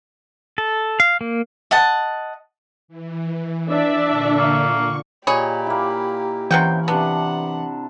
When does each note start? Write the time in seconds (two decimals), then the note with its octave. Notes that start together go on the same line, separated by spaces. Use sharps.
0.58 A4
1.00 F5
1.21 A#3
1.71 D#5 F#5 A5
2.88 E3
3.69 D4 D5 E5
4.07 A#2 D3 C#6
4.37 A#3
5.27 A#2 G4 G#4 C#5 D#5 G#5 B5
5.67 A#3 E4
6.51 C3 E3 C#4 A#4 F#5 G5
6.88 C3 B3 D4 F#5 A5